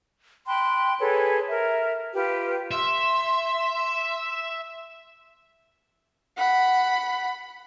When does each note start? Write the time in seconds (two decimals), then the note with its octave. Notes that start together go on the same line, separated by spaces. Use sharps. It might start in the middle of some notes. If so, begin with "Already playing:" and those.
0.46 G5 B5 C6 F#6
1.00 G#4 A4 B4 C#5
1.50 A#4 E5
2.14 F4 G4 B4
2.71 E5 C6
6.37 F#5 B5